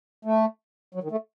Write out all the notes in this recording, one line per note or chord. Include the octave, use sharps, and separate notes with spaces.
A3
F#3
D#3
A3